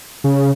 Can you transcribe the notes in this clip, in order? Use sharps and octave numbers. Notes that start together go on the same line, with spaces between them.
C#3